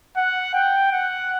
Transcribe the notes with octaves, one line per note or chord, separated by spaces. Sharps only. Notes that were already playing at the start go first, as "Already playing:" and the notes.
F#5
G5
F#5